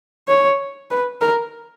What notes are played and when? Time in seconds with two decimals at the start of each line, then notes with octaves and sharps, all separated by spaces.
0.28 C#5
0.90 B4
1.21 A#4